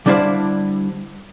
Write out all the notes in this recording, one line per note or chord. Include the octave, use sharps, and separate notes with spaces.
D3 G3 D4 E4 C5 F5